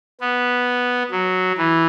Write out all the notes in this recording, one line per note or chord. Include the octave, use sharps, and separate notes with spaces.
B3
F#3
E3